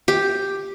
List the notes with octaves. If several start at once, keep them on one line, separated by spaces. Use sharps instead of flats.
G4